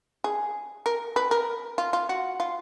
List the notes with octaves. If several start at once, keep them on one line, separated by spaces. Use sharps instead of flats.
G#4
A#4
B4
A#4
F4
F4
F#4
F4